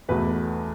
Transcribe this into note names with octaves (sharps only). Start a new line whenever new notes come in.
E2 B2 A3 B4